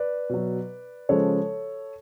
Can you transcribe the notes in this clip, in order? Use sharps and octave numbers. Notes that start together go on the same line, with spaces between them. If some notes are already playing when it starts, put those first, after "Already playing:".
Already playing: B4 D5
B2 F#3
C#3 F3 G#3 A4 C#5